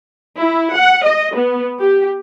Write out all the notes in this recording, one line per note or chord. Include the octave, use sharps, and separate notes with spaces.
E4
F#5
D#5
B3
G4